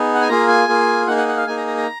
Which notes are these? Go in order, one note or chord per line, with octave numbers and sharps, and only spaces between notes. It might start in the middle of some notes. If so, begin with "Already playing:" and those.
Already playing: B3 D#4 G#4
F#5
G#5
A#3 F4 G#4 A#5
G#5
A#3 F4 G#4
A#3 D#4 G#4 F#5
F#5
F#5
F5
A#3 D#4 G#4 G#5
A#5
A#5
A#5